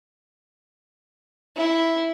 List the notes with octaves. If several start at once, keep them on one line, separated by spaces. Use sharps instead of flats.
E4